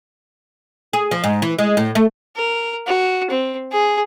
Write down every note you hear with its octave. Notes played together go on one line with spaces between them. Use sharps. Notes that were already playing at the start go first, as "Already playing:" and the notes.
G#4
F3
G#2
E3
G#3
A2
A3
A#4
F#4
C4
G#4